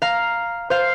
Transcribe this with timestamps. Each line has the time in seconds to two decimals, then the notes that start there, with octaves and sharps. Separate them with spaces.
0.02 F5 A#5
0.70 C5 F5